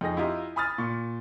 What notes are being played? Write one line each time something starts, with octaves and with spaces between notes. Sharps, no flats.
F2 D#4 G#4 A#6
E4 F4 G4 D#5 A#5
G#5 B5 D#6 F6 A6
A#2 C#6